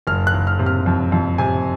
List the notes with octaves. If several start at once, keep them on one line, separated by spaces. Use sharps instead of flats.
F#1 F6
F#6
F#1
F6
C3
F6
F2
F2
C3 G#5